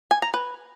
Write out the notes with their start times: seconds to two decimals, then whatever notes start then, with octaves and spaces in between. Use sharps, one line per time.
0.11 G#5
0.22 A#5
0.34 B4